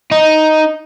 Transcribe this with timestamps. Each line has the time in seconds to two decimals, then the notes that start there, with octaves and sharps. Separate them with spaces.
0.11 D#4